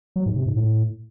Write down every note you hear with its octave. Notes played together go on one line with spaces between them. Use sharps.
F#3
G#2
C3
G#2
A2